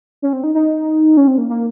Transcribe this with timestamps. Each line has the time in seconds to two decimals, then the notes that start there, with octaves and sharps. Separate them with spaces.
0.22 C#4
0.33 C4
0.44 D#4
0.55 D#4
1.17 C#4
1.28 C4
1.38 A#3
1.49 A#3